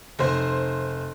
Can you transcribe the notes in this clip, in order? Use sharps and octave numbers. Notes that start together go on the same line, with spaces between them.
F1 C5